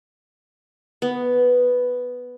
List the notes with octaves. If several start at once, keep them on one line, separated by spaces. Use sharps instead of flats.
B3